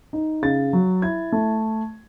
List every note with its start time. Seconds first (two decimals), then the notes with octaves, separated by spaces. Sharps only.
0.13 D#4
0.42 C#3 A6
0.73 F#3
1.02 E4 G#6
1.32 A3